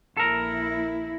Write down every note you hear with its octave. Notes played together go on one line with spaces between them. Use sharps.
A#1 A#3 E4 A4 A#4